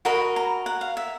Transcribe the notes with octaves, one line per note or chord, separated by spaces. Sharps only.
F#4 A#4 D#5 B5
A#5
F#5
F5
E5